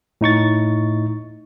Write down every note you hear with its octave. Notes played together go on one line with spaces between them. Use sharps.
A2 D#4 C#6 A6